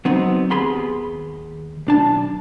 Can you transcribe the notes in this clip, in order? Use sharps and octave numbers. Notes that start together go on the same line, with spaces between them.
F#3 B3 C4 D#4
D#2 B3 G#4 B5 C6
B1 D4 A5